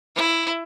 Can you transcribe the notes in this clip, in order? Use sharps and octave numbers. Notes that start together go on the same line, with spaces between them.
E4